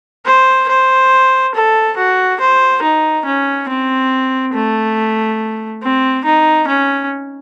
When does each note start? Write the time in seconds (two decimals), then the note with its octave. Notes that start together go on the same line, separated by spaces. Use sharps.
0.26 C5
0.69 C5
1.55 A4
1.97 F#4
2.41 C5
2.82 D#4
3.25 C#4
3.69 C4
4.54 A3
5.83 C4
6.25 D#4
6.68 C#4